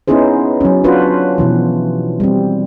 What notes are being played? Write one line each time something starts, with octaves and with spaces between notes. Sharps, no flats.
B3 C#4 D#4 E4 G#4 C5
F#3 C#4
C#4 D4 F4 F#4 B4 C5
B2 E3 F3
G3 C4